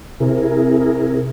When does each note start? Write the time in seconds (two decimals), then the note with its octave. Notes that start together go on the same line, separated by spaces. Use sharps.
0.20 C3 E4 G#4 A#4